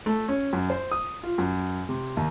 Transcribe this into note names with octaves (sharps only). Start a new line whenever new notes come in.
A3
C#4
F#2
C5
D#6
F4
F#2
C3
D#2